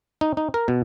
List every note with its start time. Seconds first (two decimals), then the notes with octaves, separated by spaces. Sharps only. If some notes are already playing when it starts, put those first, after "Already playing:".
0.21 D#4
0.37 D#4
0.54 A#4
0.68 B2